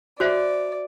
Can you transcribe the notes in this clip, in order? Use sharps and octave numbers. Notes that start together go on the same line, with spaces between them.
F#4 C5 D5 E5